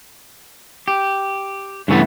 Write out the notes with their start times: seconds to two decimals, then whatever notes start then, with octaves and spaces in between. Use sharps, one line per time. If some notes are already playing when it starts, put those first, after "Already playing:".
0.88 G4
1.88 G2 C#3 E3 A3 B3